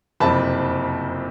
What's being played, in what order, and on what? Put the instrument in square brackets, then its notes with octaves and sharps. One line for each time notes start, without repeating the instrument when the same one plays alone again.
[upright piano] F#1 F2 C3 A5 B5